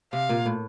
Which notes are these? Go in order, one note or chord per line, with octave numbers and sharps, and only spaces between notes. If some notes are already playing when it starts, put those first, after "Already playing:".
C3 F5
A#2
A2